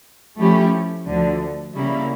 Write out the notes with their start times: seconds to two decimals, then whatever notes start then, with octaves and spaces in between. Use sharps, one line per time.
0.38 F3 A3 C#4 E4 G4
1.06 D2 D3 F3
1.74 C#3 G3 A#3 E4